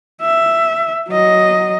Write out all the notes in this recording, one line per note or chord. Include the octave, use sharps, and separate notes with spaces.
E5
F#3 D#5